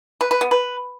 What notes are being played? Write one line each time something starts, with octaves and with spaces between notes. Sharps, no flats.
B4
B4
B3
B4